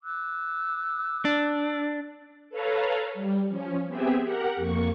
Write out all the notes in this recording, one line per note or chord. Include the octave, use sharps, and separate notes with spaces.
D6 E6 F#6
D4
A4 B4 C#5 F5 A#5
G3
F3 C#4
B3 C4 G4 G#4 E5
G4 A#4 F#5
F2 A#3 C#6